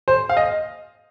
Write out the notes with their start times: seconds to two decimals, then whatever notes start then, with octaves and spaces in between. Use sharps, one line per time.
0.08 C5
0.29 F5
0.37 D#5